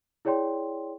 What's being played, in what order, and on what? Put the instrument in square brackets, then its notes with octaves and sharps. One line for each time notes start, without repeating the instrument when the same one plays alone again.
[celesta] E4 G#4 C#5 D5 G5 C6